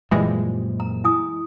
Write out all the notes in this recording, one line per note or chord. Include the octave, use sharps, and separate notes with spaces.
F#2 A#2 E3 F3 G3 G#3
A#5
E4 G#5 D#6